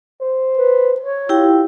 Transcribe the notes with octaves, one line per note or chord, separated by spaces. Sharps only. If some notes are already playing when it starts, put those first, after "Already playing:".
C5
B4
C#5
E4 F4 G4 G5